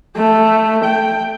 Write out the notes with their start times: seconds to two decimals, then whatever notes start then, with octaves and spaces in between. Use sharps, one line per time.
0.16 A3
0.84 G5